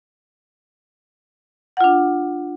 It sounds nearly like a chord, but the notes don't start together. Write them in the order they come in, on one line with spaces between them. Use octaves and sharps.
F#5 F4 D4